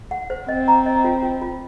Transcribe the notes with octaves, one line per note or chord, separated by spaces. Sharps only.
F#5
C5
C4 D#5
A#5
D#5
F4
F4
F4